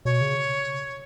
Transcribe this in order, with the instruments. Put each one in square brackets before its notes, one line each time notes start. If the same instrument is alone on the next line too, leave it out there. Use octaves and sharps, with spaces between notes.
[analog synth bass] B2 [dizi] C#5
[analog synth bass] C#3